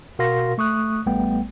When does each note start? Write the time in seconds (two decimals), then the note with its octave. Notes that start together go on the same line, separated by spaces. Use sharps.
0.19 B2 F#4 A#4 F5 C6 A#6
0.58 A3 C#6 D#6 F#6
1.06 A1 G3 A3 B3 G5